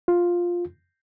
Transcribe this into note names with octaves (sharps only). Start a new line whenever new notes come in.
F4